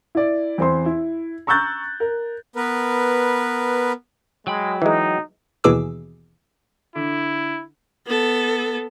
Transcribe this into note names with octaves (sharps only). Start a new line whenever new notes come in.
E4 D5
E2 C4 C5 C6
E4
A#5 C#6 E6 F#6 G6 A6
A#4
B3 A#4 B4
F#3 G#3 G5 B5
E3 G#3 D#4
D#2 B2 E3 G#4 D6 E6
D3 E4
B3 A4